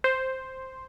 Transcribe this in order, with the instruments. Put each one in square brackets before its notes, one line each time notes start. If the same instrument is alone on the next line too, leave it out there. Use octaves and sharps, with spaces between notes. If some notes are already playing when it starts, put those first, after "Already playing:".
[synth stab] C5